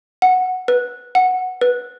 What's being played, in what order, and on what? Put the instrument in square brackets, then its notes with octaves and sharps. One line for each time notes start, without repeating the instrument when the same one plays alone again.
[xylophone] F#5
B4
F#5
B4